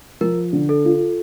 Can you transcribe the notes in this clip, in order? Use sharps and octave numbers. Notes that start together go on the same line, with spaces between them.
F3 A#4
D3
A4
F4